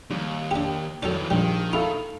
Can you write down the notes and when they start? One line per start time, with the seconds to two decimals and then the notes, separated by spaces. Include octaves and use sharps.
0.10 D#2 G3
0.51 D4 G4
1.03 D#3 E3 F#3 A4 D5
1.30 A#1 D#3 G3
1.73 E4 F4 A4 F5 B5